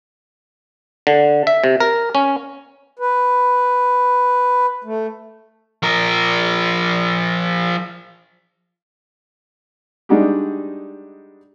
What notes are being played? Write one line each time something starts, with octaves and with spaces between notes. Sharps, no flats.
D3
E5
C3
A#4
C#4
B4
A3
F3 A#4
G3 G#3 D4 D#4 F#4 G4